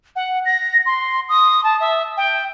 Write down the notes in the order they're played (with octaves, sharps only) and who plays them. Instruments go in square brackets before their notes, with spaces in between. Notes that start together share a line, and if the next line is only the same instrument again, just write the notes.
[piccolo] F#5
A#6
C6
D#6
A5
E5
G5